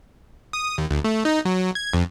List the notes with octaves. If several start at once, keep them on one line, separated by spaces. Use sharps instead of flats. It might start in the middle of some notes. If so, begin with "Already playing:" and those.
D#6
D#2
D2
A3
D#4
F#3
G#6
F2